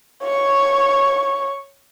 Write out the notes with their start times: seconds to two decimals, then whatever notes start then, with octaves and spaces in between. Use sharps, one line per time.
0.23 C#5 C#6